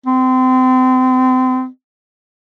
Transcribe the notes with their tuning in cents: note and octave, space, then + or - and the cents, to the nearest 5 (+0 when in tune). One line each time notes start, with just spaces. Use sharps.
C4 -30